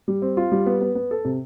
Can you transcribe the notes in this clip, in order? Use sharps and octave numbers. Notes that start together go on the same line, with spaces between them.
G3
C4
F4
G3
B3
B3
B3
A4
C3